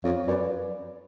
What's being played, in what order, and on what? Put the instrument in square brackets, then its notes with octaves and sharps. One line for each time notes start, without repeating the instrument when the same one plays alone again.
[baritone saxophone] F2 [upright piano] C#5 F5
[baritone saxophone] F#2 [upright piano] B4 D5